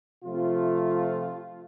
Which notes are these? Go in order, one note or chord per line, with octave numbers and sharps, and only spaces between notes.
C3 F3 A3 C4 F4